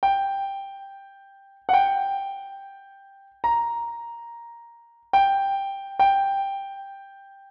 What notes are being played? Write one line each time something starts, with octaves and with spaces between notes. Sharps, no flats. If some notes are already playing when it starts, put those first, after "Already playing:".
G5
F#5
G5
A#5
G5
G5